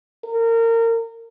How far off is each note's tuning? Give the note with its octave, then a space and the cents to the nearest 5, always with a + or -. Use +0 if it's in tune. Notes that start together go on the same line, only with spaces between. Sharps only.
A#4 -25